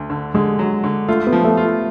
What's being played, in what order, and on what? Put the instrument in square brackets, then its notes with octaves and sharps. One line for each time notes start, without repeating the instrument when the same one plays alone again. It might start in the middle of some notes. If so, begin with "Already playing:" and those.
Already playing: [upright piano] D2
D3
[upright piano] D3 [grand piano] G#3
[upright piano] F#3
D3
[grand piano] A3 [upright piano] F4
[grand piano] B3
[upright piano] F3
[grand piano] A3
[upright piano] F4